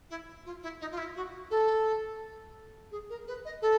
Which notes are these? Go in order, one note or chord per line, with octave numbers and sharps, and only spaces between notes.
E4
F4
E4
D#4
F4
E4
F#4
A4
G#4
A#4
B4
D#5
A4